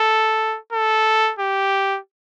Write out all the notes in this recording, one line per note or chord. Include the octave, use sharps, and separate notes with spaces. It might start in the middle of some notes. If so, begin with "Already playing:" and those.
Already playing: A4
A4
G4